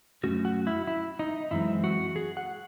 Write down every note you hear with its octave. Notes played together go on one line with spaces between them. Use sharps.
F#2 D#3 A3 C#4 F#4
F#4
E4
E4
D#4
F#2 E3 G#3 C4 E4
F#4
G#4
F#5